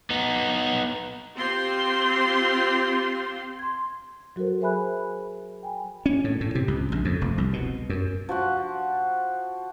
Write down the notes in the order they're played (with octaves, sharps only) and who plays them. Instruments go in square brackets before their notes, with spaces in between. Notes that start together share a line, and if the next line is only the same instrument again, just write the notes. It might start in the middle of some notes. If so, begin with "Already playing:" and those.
[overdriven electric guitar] B3 D#4
[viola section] C4 F4 G4 C5 C6
[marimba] C6 G#6
F#3 F#4 A4 A#4 C5
G#4 C5 E5 G#5 B5 F#6
G5 G#5 B5
[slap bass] C#4
A2
A2
C3
C#2
A#1
F2
F1
C2
B2
F#2
[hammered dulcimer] F3 F#4 F#5